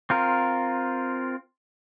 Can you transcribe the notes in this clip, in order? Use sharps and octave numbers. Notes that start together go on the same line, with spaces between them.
C4 F4 A#4